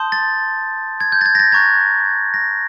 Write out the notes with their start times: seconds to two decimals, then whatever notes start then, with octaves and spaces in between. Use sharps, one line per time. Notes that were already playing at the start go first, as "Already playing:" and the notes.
Already playing: A5 C6 D#6 G6
0.12 A6
1.00 G#6
1.12 G6
1.21 A6
1.26 G#6
1.35 A#6
1.39 A6
1.52 A#5 C#6 F#6 G#6
2.34 A#6